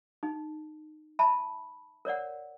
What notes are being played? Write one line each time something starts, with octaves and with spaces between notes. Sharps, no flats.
D#4
E5 A5 B5
A#4 C#5 D5 F#5